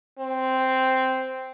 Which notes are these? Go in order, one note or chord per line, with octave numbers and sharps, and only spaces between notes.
C4